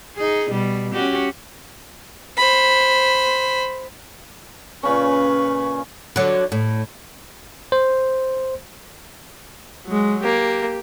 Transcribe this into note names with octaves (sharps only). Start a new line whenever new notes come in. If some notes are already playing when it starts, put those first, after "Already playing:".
D#4 G#4
B2 G3
C#4 F#4 G4
C5 B5
A#2 C#3 C#4 B4 C#6
D3 F#3
A2
C5
F#3 G#3
A#3 G4